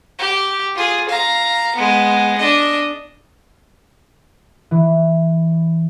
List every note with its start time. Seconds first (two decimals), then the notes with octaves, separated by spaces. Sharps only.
0.19 G4
0.75 F4 G#4
1.09 F5 A#5
1.76 G#3 B3
2.38 D4 D#5
4.71 E3